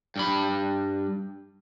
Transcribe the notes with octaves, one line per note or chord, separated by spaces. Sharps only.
G2 B5